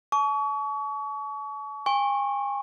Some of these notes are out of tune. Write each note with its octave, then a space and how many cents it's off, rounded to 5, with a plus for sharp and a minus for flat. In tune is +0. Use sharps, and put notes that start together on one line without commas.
A5 -40 C#6 +35
G#5 -40 C#6 -30